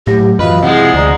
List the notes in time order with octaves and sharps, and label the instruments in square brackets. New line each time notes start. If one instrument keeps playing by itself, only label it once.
[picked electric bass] A2 [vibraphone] F#3 A3 [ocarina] G4
[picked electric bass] F#2 E3 [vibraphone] F4 F#4 F5 [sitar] B4 [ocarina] D#5
[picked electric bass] C3 [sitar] F3 G#3 [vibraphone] E4 G#4 [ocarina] F#5
[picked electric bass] D2 [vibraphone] D5 A#5